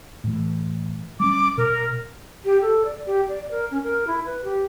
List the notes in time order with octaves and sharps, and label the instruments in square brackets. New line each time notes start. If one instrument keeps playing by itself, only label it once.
[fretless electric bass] A2 E3
[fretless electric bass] G3 B3 C#4 [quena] D6
[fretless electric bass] B2 [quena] A#4
[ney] G4
A4
D5
G4
D5
A#4
C#4
A#4
E4
B4
G4